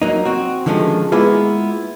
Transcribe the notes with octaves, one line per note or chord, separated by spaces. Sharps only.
F#3 A#3 D#4
C4 F#4
D3 D#3 F3 G#3 A3 C#4
G#3 A#3 B3 E4 F4 G#4